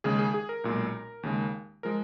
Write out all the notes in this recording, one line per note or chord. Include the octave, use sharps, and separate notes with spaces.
D#2 C#3 G#3 G#4
G#4
G#4
A#4
B1 A#2 G#3
D#2 C#3 G#3
F3 G#3 A#4